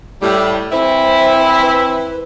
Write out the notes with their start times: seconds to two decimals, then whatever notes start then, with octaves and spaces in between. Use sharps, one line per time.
0.22 A2 G3
0.72 E3 C4 E4 C5
1.62 B4